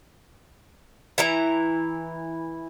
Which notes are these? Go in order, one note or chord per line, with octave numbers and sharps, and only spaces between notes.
E3 E4 A#5